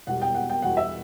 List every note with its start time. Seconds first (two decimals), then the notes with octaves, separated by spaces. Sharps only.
0.07 E1 E2 B2 G3 F#5
0.22 G5
0.35 F#5
0.50 G5
0.62 E1 E2 B2 G3 F#5
0.77 E5